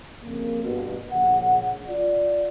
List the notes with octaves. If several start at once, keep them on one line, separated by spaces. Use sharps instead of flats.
F2 C#3 A#3
G2 B2
A#1 C#3 F#5
F4 D5